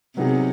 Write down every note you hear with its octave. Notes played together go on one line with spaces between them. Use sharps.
C3 F#3 B3 D#4 G#4